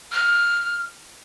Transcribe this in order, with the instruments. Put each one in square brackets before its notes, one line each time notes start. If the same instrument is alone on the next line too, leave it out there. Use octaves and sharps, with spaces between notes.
[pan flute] F6